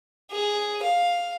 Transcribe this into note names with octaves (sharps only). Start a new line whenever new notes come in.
G#4
F5